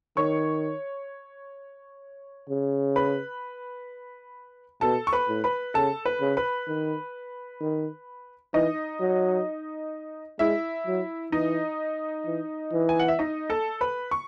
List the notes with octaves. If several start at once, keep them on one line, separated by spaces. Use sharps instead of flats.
D#3 C#5 C#6
C#3
B4 B5
B2 A4 A5
C#6
B4 B5
A2
B4 B5
C#3 A4 A5
B4 B5
C#3
B4 B5
D#3
D#3
E3 D#4 D#5
F#3
G#3 E4 E5
F#3
E3 D#4 D#5
E3
E3
G#5
F#5
E5
D#4 D#5
A4 A5
B4 B5
C#6